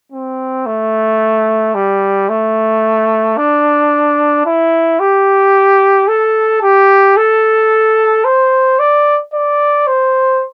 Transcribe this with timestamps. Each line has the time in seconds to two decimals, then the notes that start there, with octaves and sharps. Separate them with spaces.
0.12 C4
0.66 A3
1.75 G3
2.29 A3
3.37 D4
4.46 E4
5.00 G4
6.08 A4
6.62 G4
7.17 A4
8.25 C5
8.79 D5
9.33 D5
9.87 C5